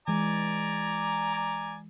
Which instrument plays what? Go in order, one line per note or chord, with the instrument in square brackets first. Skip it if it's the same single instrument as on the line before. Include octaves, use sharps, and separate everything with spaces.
[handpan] E3 G#3 [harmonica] D5 G#5 A#5